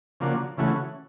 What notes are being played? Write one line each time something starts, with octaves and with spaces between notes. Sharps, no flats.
C#3 F3 A#3 D4 F#4
C#3 E3 A3 C#4 F#4